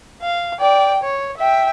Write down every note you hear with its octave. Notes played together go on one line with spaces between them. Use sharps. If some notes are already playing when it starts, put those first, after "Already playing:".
F5
D5 G5
C#5
E5 G5